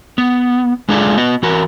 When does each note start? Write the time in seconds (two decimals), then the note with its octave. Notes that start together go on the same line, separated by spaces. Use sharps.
0.18 B3
0.89 G#3 D4 F4 G#4 A4 D5
1.17 B3 F#4 D#5
1.43 E3 F#4 A#4